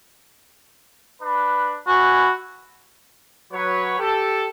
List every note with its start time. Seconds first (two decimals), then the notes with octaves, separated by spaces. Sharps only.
1.21 D4 B4
1.88 E4 F#4 B4 G#5
3.52 F#3 B4 C#5
3.99 G4 A4